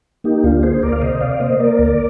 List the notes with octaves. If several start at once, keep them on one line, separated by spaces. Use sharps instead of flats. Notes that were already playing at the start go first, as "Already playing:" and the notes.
A#3 D#4 G4
D2 D4 F4
A#3 G#4 C5
D2 A#4 D5
F5
C3 C5 D#5
C3 D5 F5
A#3 C5 D#5
A#3 A#4 D5
D2